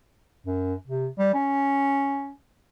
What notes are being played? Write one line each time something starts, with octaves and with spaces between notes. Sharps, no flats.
F#2
C3
G3
C#4